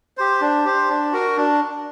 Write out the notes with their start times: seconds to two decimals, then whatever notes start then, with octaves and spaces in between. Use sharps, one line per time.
0.17 G4 C5
0.41 D4
0.65 G4 C5
0.89 D4
1.13 F#4 A#4
1.37 D4